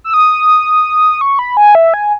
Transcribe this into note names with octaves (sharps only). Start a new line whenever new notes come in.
E6
D#6
C#6
B5
G#5
E5
G#5